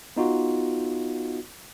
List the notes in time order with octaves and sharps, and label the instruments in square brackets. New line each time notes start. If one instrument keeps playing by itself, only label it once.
[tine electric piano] B3 D#4 F4 F#4